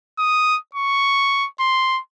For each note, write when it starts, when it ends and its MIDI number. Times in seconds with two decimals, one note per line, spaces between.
0.19 0.58 87
0.75 1.47 85
1.60 2.00 84